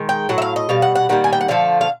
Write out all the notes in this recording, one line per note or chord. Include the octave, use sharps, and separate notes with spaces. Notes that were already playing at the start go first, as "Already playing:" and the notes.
Already playing: D#3 G#3
G5
A2 F#3 F#5
E5
F5
D#5
B2 G3 F5
F#5
F#5
D#3 G3 A#3 F#5
G#5
G5
F#5
D3 F3 A3 F5
F5